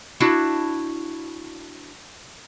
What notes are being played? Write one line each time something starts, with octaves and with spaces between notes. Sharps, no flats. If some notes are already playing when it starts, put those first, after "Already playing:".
D4 E4 F#4 A5